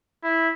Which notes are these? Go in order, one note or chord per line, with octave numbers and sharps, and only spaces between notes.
E4